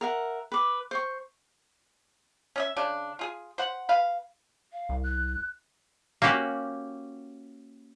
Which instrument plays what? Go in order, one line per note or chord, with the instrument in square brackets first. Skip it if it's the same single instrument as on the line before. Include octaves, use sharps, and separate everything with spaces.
[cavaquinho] A#4 E5 F#5
B4 D6
C5 C#6
[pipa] C#4 D#5 E5
C#3 D4
F4 G#4
C5 F#5
B4 F5
[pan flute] F5
[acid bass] C2
[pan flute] F#6
[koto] A#3 C#4 F#4 G4